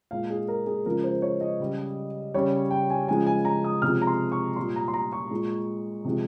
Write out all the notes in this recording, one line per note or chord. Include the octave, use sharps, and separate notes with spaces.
A#2 G#3 F5
G#4
A#4
G#4
C#3 F3 G#3 A#4
C5
C#5
D#5
C#3 G3
C#3 G3 C#5
G5
G#5
C#3 F3 G#3 G#5
G#5
A#5
D#6
C3 F3 G#3 F6
A#5
C6
C#6
A#2 G3 C6
A#5
C6
A#5
C#6
A#2 G#3
C3 F3 G#3